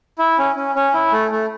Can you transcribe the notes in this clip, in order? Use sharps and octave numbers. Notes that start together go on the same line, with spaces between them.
E4
C#4
C#4
C#4
E4
A3
A3